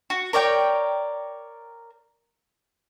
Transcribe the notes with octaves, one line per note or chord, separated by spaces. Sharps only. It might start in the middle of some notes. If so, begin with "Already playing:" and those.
F#4
A#4 C#5 D5 G5